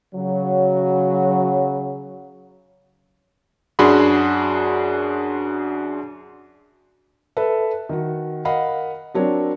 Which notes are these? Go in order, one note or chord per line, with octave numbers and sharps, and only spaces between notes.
C#3 F#3
F#2 D4 F#4 G#4 B5 C6
A4 B4 E5
D#3 F#4
A#4 D#5 F5 F#5 B5
F#3 C4 D4 A#4 C#5